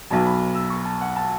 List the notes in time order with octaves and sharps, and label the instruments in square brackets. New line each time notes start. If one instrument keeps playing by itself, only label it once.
[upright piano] B1 B2 F#3 A5
B5
E6
C#6
A5
F#5
A5